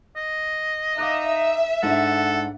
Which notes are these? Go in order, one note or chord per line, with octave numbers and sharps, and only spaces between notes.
D#5
D#4 E5 F5 D6 F#6
G#2 D4 A4 F#5